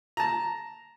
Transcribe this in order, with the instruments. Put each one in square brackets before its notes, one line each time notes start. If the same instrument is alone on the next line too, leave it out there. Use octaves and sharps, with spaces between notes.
[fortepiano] A5 A#5